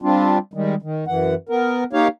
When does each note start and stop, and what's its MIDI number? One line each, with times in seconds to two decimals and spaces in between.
0.02 0.38 55
0.02 0.38 60
0.02 0.38 62
0.02 0.38 65
0.54 0.75 51
0.54 0.75 55
0.54 0.75 56
0.82 1.05 51
1.07 1.35 42
1.07 1.35 52
1.07 1.35 78
1.49 1.84 59
1.49 1.84 70
1.93 2.08 58
1.93 2.08 63
1.93 2.08 67
1.93 2.08 73
1.93 2.08 77